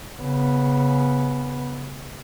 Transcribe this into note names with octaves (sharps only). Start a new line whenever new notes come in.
C#3 B3